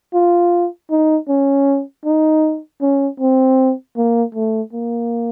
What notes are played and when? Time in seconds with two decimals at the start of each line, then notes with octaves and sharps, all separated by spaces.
0.14 F4
0.90 D#4
1.28 C#4
2.05 D#4
2.82 C#4
3.20 C4
3.97 A#3
4.35 A3
4.73 A#3